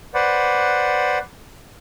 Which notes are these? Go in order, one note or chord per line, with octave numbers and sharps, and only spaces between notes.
B4 C5 D5 F#5